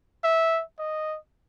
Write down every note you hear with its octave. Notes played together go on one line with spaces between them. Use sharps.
E5
D#5